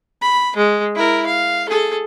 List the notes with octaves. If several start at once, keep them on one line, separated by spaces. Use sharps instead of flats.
B5
G#3
E4 A#4
F5
G#4 A4